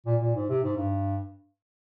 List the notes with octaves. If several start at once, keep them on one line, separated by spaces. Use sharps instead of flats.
A#2
A#2
G#2
C3
G#2
G2